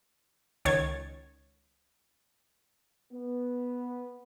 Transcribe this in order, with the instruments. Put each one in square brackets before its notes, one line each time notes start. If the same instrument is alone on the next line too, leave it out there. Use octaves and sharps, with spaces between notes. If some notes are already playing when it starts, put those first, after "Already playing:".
[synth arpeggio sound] C#2 D#3 C#5 G#6 A6
[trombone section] B3